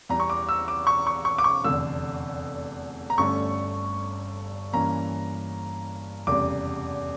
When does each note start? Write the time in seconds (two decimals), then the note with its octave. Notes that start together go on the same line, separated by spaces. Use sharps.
0.09 E2 E3 G3 A#5
0.20 C#6
0.29 D6
0.49 E6
0.68 D6
0.87 C#6
1.07 C#6
1.25 C#6
1.38 D6
1.44 C#6
1.64 F1 E2 D3 E6
3.10 A#5
3.18 G1 G2 D3 A3 C#4 C#6
4.73 G2 E3 A#3 C#4 A#5
6.27 F1 E2 C#3 G3 D6